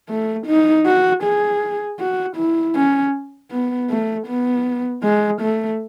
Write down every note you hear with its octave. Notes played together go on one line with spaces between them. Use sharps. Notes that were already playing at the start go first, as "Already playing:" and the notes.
A3
D#4
F#4
G#4
F#4
E4
C#4
B3
A3
B3
G#3
A3